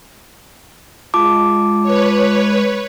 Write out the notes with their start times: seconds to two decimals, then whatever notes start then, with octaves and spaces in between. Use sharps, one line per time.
1.14 G#3 F4 A5 D6
1.83 B4 C#5